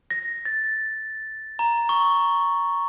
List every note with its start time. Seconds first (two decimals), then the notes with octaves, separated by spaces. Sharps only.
0.11 A#6
0.45 A6
1.59 A#5
1.89 C#6